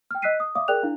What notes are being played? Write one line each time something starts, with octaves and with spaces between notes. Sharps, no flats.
G5 F6
D#5 E6 F#6 B6 C7 D#7
D#6
D5 E5 F5 D6 D#6
G#4 A#4 D5 G5 F#6 F7
D4 E4 F5